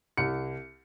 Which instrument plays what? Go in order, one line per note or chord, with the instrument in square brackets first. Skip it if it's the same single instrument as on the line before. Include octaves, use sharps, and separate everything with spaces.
[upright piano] C2 C#7